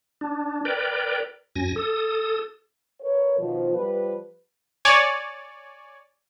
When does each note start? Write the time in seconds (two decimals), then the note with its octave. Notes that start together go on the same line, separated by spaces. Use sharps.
0.21 D4
0.65 A#4 B4 D5 G5
1.56 F#2 G#5 A#6
1.76 A4 D#6
3.01 A#4 B4 C#5
3.38 B2 D#3 F3
3.74 F3 G3 B4
4.85 C#5 D5 G#5